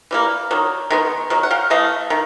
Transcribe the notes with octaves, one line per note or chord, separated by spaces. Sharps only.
E3 G3 A#3
D#3 F#3
D#3 G#3 B3
D#3 F#3
F#5
F5 G5
E3 A3 D#5 F5
D#3